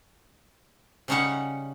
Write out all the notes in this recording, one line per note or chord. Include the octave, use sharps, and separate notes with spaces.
C#3 G3 C#4 D#4 C#5 F#5